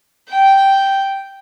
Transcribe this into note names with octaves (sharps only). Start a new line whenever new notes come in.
G5